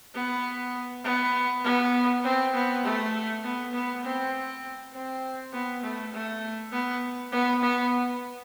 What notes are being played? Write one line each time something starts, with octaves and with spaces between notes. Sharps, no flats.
B3
B3
B3
C4
B3
A3
B3
B3
C4
C4
B3
A3
A3
B3
B3
B3